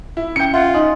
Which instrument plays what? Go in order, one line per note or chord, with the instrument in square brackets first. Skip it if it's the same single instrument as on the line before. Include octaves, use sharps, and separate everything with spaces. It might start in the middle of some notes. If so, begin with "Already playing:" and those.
[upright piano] E4
[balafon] C#4 G5 [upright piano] G6 C#7
[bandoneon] F4 [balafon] E5 [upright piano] F#5
[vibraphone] D#4 [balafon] D#5 G#5